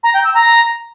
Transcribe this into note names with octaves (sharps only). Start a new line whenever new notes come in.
A#5
G5
E6
A#5